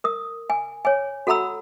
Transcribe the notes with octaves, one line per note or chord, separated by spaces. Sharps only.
A#4 D#6
G#5
C#5 G#5
F#4 A4 F#5 A#5 B5 E6